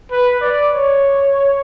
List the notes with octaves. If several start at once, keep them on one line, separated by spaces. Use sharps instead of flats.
B4
D5
C#5